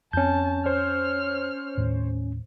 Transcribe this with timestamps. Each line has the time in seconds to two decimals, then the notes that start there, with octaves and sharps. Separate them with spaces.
0.13 F2 C4 C#4 A5 G6
0.66 C5 C#5 F6
1.78 D#2 A2